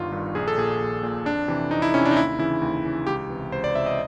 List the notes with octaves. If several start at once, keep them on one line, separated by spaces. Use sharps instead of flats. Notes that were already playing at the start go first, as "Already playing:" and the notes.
Already playing: G1 G2 D#3 F4
G2 D#3
A#1 G#4
A4
A#2 G#4
A#1
A#2
F2 D4
C3 E3
F2 D#4
E4
C3 E3 C#4
D4
D#4
D#2 E4
C#3 E3 E4
D#2
C#3 E3
C#2 G4
C3 E3
C#2 C5
D5
C3 E3 E5
D#5